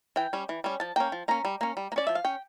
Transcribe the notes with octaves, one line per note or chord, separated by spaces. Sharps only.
E3 G5
G3 C#4
E3
G3 C#4
F3 A5
A#3 C#4 G5
F3
A#3 C#4 A#5
G3
A#3 C#4
G3
A#3
C#4 D5
F3 E5
F5
C#4 G5